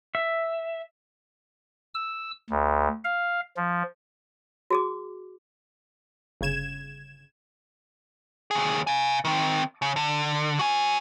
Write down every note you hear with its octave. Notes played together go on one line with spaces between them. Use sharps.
E5
E6
D2
F5
F3
F#4 G#4 D6
G1 C#3 G#6 E7
D#2 G#4
F5 G#5
D#3 C4
C#3
D3
F#4 G#5